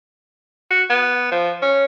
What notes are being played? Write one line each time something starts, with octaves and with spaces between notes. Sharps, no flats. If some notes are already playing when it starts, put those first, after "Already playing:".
F#4
B3
F3
C#4